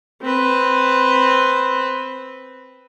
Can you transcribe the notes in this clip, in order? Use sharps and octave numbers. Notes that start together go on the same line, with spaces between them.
C4 B4